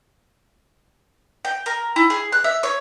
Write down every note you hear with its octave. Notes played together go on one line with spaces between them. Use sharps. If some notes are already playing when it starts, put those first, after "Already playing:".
G5
A#4
E4
G#4
F#6
E5
C#5